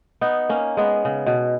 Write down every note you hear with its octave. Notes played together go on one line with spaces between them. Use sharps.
B3 D#4
A#3 C#4
G#3 B3
C#3
B2